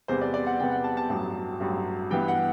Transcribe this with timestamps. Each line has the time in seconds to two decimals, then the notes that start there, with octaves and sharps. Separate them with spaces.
0.08 E2 C3 G3 B3 C5
0.21 D5
0.34 D5
0.47 F#5
0.60 E2 C3 G3 B3 G5
0.71 F#5
0.84 A5
0.97 A5
1.09 A1 G2 F#3
1.60 A1 G2 F#3
2.11 G2 E3 B3 G5
2.28 F#5